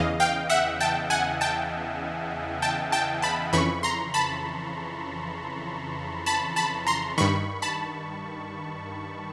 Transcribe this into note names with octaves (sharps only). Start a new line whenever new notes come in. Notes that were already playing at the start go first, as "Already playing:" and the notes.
Already playing: E2 C#3 E3 D#5 F5
F5 G5
E5 F#5
G5 A5
F#5 G#5
G5 A5
G5 A5
G5 A5
A5 B5
F2 C#3 E3 B5 C#6
A#5 C6
A5 B5
A5 B5
A5 B5
A#5 C6
G2 D#3 B5 C#6
A5 B5